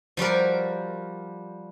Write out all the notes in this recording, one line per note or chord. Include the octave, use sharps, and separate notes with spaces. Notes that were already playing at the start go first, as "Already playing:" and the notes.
F3 G3 F#4 A#4